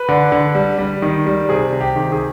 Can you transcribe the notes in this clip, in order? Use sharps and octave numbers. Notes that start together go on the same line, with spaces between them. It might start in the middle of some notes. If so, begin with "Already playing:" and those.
Already playing: B4
D3
D3
G3
G3
D#3
G3
C3 G#4
C3
G4
D#3
G#4